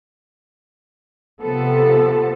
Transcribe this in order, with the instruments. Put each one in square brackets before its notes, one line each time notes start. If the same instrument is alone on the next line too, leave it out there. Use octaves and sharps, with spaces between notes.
[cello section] C3 F3 B3 A4